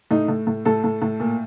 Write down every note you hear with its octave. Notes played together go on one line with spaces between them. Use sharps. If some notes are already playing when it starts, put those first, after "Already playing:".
A2 D#4
A2
A2
A2 A4
A2
A2
A#2